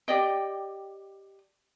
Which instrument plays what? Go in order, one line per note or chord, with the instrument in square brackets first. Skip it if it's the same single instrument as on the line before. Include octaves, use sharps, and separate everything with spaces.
[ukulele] G4 D5 D#5 G5